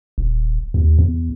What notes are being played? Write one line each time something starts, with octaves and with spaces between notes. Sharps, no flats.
D#1
D#2
E2